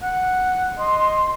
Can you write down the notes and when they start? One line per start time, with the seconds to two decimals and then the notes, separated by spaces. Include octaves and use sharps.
0.02 F#5
0.78 D#5 C6